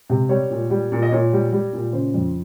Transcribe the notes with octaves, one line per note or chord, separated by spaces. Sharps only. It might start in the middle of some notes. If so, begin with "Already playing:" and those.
C3
G3 C#5
A#2
G3
A#2
D#5
A#2 C#5
G3
G3
A#2
C#3 C5
F2